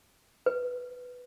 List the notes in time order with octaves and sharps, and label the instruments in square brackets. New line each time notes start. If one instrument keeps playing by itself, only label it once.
[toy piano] B4